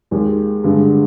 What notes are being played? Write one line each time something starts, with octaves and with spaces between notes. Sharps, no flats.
D#2 D#3 G#3
G2 D3 G#3